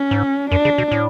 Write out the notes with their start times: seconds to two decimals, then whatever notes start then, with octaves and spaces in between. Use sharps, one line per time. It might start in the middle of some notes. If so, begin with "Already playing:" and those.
Already playing: C#4
0.11 G#2
0.51 F#2 D4
0.65 C#3
0.78 B2
0.91 A2